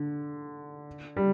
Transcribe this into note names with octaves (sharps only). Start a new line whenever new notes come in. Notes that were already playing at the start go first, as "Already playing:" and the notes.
Already playing: D3
G3